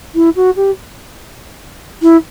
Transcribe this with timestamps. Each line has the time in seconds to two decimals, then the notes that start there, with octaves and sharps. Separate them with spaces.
0.15 E4
0.35 F#4
0.56 G4
2.02 E4